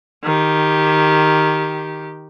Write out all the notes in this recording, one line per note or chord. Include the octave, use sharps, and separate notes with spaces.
D#3 G4